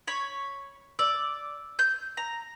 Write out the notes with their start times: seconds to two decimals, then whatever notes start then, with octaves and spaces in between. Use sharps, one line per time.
0.07 C#5 B5
0.99 D5 E6
1.79 G6
2.17 A#5